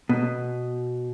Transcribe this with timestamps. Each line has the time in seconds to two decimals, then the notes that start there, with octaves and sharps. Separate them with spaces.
0.09 B2